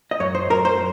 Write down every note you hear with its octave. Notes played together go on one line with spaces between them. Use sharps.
D#5
F#2 C#5
C5
F#2 A#4
C5